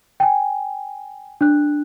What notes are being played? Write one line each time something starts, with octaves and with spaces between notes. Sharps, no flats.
G5 G#5
D4 F#6